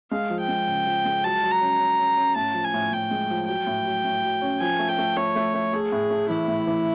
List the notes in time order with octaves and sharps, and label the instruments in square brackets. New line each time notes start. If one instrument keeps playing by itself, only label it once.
[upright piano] G#3 [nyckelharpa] F5
[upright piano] F3
[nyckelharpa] G5
[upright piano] G#3
C#3
F3
G#3
[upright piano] F#3 [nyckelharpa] A5
[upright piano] F#3
[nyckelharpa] A#5
[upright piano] C#4
C#4
C#4
C#4
[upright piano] A2 [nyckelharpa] A5
[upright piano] F3
[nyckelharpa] G#5
[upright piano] A2
[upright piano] A2 [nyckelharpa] G5
[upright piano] G#3
F3
[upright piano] F#3 [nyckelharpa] G5
[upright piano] A2
F#3
A2
F#3
C#4
[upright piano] F3 [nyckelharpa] G#5
[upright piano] A3
[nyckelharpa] G5
[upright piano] A3
[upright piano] A3 [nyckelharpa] C#5
[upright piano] A3
A3
[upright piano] A3 [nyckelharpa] G#4
[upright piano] A2
A3
[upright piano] E3 [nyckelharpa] E4
[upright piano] A2
E3